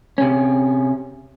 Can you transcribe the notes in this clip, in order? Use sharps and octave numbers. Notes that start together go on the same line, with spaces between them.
C3 C#4